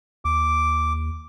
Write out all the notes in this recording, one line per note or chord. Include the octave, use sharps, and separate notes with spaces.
D#2 D6